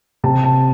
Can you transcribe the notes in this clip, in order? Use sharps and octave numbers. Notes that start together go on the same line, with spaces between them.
C3 A5
A5